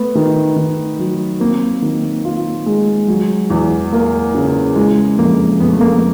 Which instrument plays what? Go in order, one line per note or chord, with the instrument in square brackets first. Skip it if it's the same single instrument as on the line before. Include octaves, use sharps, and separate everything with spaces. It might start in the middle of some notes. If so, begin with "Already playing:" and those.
Already playing: [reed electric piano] A3 [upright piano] B3
[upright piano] D#3
D#3
F#3
[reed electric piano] A#3 [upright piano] C4
[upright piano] D#3
F4
G#3
F#3
E2
A#3
C#3
[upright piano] E3 [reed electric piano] G#3
[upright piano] F2 [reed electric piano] A#3
[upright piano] F2 [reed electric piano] B3
[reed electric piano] A3
A#3